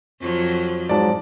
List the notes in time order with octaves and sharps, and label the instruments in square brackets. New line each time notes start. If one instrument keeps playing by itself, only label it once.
[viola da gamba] F2 F3 F#3
[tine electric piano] G#2 F#3 [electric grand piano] D5 A5